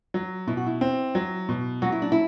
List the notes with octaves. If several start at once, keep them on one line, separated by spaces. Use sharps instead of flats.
F#3
B2 E4
F#4
E4
C4
F#3
B2
F#3 F#4
E4
D4
E4